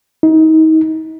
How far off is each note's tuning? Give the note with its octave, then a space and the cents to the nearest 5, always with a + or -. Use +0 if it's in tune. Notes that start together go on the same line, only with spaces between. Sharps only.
D#4 +30